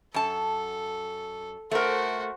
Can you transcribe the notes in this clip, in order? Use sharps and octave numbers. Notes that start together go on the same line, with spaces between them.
F#2 A4 A5
A3 F#4 A#4 C5